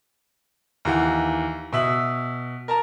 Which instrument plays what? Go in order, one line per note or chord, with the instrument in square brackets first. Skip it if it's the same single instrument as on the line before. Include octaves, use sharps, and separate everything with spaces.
[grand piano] D#2 E3 F#5
B2 E5 F#7
A#4 A5 A#5